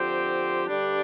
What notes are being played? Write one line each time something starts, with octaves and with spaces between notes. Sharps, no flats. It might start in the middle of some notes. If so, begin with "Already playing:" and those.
Already playing: D3 F3 C4 G4 C5
G2 D3 G3 D4